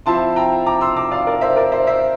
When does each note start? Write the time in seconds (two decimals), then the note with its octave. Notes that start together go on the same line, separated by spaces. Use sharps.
0.06 F3 C4 E4 A5 C6
0.36 G5 A#5
0.66 A#5 D6
0.81 C6 E6
0.96 A#5 D6
1.11 D5 F5
1.27 A#4 D5
1.41 C5 E5
1.56 A#4 D5
1.72 C5 E5
1.87 C5 E5